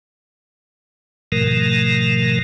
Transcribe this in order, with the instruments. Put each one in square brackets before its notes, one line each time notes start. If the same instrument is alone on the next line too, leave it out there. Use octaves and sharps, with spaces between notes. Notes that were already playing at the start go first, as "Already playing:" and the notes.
[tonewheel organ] G#2 B2 D#3 F3 A3 A#4